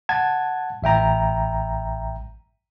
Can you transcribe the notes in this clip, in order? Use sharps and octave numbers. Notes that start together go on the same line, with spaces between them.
F#5 A5 G#6
A1 E5 G5 A#5